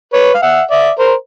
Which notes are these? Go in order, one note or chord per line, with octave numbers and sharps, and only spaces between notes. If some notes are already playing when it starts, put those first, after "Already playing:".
B4 C#5
F5
E5 F#5
D5 E5
A#4 C5